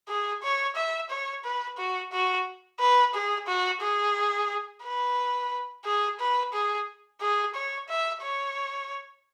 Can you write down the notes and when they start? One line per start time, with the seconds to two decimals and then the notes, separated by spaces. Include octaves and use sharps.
0.09 G#4
0.43 C#5
0.76 E5
1.10 C#5
1.44 B4
1.78 F#4
2.12 F#4
2.80 B4
3.14 G#4
3.47 F#4
3.81 G#4
4.83 B4
5.85 G#4
6.19 B4
6.53 G#4
7.21 G#4
7.54 C#5
7.89 E5
8.22 C#5